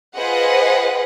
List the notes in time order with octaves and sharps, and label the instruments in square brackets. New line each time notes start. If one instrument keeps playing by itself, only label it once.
[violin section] F4 G#4 B4 C5 D#5 F#5